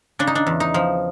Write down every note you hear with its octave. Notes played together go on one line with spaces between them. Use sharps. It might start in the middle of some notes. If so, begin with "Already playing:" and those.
C#3 D4
D#4
D4
E2
D#4
F3